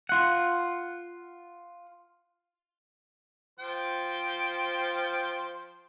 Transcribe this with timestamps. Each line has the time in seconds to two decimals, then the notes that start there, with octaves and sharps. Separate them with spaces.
0.09 F4 F#5
3.59 F3 C5 G5